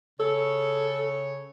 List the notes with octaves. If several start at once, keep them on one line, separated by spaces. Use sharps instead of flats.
C#3 A4 C#5